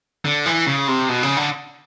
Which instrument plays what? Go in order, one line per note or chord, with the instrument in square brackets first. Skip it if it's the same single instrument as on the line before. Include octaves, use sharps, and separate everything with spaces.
[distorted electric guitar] D3
E3
C#3
C3
B2
C#3
D3